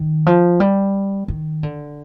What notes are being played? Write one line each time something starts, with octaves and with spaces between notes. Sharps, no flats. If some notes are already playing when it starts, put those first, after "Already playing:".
Already playing: D#3
F3
G3
D#3
D3